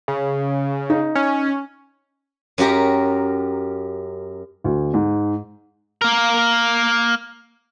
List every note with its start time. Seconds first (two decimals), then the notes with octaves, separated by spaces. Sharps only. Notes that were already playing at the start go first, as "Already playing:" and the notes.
0.08 C#3
0.90 D#4
1.15 C#4
2.58 F#2 F#4 G4 A#4
4.64 D2
4.94 G#2
6.02 A#3 A#4